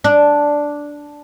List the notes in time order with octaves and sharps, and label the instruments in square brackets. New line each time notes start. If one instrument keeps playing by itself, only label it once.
[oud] D4